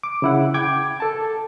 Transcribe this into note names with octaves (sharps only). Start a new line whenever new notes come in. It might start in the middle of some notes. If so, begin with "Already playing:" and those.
D6
C#3 E4 F#5
G5 D6 G#6
A4 A5